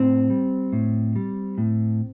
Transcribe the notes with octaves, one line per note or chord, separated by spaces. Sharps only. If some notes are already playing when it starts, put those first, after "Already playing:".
Already playing: A2 C4
G3
A2
G3
A2